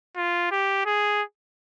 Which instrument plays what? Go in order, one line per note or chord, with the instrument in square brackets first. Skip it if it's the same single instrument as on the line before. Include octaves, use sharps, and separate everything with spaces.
[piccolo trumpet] F4
G4
G#4